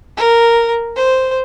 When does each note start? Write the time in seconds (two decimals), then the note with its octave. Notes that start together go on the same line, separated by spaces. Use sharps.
0.17 A#4
0.96 C5